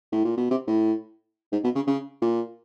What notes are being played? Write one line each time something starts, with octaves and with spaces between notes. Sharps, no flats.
A2
A#2
B2
C3
A2
G#2
B2
C#3
C#3
A#2